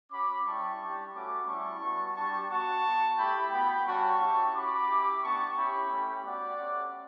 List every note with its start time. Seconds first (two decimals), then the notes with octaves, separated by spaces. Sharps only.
0.11 C#4 F#4 B5 D6
0.45 G3 C#4 E4 G4 A5 C#6
0.80 G3 D4 G4
1.14 A3 C#4 F#4 B5 D6
1.47 G3 C#4 E4 A5 C#6
1.82 G3 B3 F#4
2.16 G3 D4 G4 A5 C#6
2.50 B3 F#4 A5 C#6
2.84 B3 F#4
3.18 A3 E4 G4 G5 B5
3.52 B3 F#4 G5 B5
3.86 G3 C#4 F#4 A5 C#6
4.20 C#4 E4 G4
4.54 C#4 F#4 B5 D6
4.88 C#4 E4 G4
5.23 B3 D4 G4 A5 C#6
5.57 C#4 E4 G4 G5 B5
5.91 A3 C#4 G4
6.25 B3 F#4 D5 F#5
6.59 A3 C#4 G4